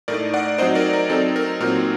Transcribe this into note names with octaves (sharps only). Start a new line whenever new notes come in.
A2 A3 D#4 A#4 D5
D5 F#5
F#3 C4 D#4 C5 D#5
A#4 D5
A#4
F#3 C4 D#4 A4
A#4
A#2 F#3 C4 D#4 A#4